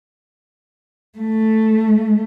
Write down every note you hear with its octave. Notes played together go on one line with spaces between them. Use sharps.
A3